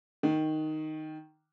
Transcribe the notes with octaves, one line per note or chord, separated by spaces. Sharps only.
D#3